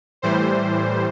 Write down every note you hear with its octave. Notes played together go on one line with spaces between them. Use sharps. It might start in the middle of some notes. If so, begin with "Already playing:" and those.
A2 E3 G3 C5